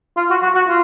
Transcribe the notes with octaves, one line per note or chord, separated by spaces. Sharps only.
F4
F#4
F#4
F#4
F4